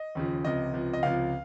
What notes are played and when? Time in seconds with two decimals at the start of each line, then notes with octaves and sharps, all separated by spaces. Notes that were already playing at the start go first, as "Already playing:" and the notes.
Already playing: D#5
0.15 D#2 C#3 F3
0.44 C#2 C3 F3 D#5
0.74 C#2 C3 F3
0.93 D#5
1.03 C#2 C3 F3 F5